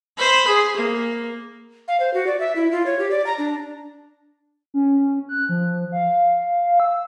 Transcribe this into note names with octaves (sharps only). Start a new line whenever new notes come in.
C5 B5
G#4
A#3
F5
C5
F#4
D5
E5
E4
F4
C#5
G4
D5
A#5
D4
C#4
F#6
F3
F5
E6